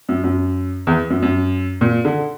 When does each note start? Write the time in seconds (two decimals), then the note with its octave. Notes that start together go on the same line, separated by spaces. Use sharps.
0.09 F#2
0.24 F#2
0.87 E2
1.10 F#2
1.22 F#2
1.81 A#2
2.05 D3